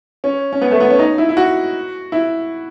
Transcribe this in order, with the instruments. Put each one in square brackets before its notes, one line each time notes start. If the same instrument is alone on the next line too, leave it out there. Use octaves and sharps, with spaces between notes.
[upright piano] C#4
C#4
B3
A3
B3
C#4
D#4
E4
E4
F#4
E4